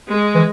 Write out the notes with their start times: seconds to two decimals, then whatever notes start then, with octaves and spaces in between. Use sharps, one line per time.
0.08 G#3
0.35 E3